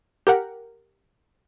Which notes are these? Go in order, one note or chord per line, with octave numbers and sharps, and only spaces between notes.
G4 A#4 F#5